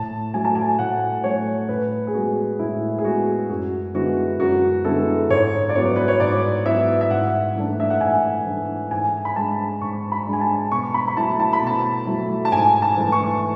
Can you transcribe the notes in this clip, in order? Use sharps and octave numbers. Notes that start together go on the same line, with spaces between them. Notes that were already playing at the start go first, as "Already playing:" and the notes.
Already playing: A2 A5
F#3 A3 G#5
A5
G#5
A2 F#5
F#3 A3 C#5
A2 B4
G#4
G#3 B3 F#4
A2 E4
G#4
G#3 B3 F#4
F#2 F#4
D3 G#3 B3 E4 F#4
F#2 F#4
D3 G#3 B3 E4 A4
G#2 C#5
D5
F#3 B3 E4 C#5
B4
C#5
G#2 D5
F#3 B3 E4 E5
E5
G#2 F#5
E3 A3 D4
E5
F#5
G#2 G#5
E3 A3 D4
G#2 G#5
B5
G#3 D4 A5
G#2 C#6
B5
G#3 D4
G#5
A5
B2 C#6
B5
B5
F#3 A3 E4 A5
A5
B5
B2 A5
F#3 A3 E4
A5
G#2 G#5
A5
E3 A3 E4
C#6